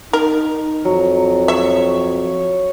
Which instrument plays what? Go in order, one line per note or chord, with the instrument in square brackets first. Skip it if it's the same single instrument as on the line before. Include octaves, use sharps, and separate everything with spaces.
[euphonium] D#4 [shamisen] A#4
[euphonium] F2 [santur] F#3
[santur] C#5 [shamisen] E5